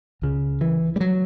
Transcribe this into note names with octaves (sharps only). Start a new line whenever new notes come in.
C#2 C#3
E3
G3
F#3